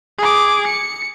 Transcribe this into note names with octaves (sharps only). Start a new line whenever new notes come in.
G#4 D6
C#7